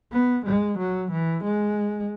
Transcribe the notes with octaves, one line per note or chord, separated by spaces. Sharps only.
B3
G#3
F#3
E3
G#3